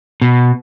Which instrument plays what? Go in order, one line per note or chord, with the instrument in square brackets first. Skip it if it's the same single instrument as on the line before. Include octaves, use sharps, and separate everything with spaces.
[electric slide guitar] B2